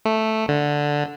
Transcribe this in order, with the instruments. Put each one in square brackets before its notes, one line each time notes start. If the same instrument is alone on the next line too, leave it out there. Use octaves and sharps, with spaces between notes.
[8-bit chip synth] A3
D3